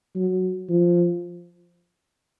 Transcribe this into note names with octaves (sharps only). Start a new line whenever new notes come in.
F#3
F3